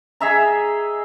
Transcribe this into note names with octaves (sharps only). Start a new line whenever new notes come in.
G#4 D#5 E5 A#5